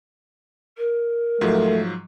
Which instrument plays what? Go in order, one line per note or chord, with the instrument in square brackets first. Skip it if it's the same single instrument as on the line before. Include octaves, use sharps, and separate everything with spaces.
[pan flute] A#4
[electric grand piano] G#2 F3 F#3 [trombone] A3